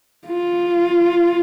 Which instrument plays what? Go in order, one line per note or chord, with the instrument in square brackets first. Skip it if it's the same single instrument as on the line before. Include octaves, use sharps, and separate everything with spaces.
[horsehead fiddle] F4